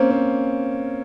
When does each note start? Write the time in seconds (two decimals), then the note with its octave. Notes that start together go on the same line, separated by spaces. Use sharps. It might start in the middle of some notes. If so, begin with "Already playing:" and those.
Already playing: A#3 C4 C#4
0.10 C4